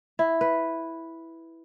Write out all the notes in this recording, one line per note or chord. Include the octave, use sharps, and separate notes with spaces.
E4
B4